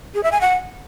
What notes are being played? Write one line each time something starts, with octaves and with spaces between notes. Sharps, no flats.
G#4
E5
G#5
F#5